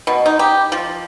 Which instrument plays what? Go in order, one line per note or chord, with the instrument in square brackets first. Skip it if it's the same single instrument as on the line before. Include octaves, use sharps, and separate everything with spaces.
[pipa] B2
D#4
G4
F3